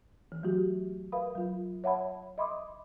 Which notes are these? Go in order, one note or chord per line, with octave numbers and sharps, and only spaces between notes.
E3
F#3 A3 F#4 G4
A#4 B4 E5 F5 B5 D#6
F#3 F4
C#5 E5 F#5 A5 B5
D#5 E5 B5 C6 D6 D#6